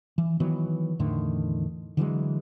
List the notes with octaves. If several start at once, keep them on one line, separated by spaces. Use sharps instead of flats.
E3
D#3 E3 F#3 B3
E2 A2 D3 D#3
D3 E3 F#3 G#3